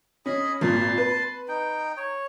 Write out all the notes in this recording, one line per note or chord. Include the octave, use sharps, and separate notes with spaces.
C#4 G#4 D#5 B5
G#1 A#2 A5 C6
B4
D#4 G5
C#5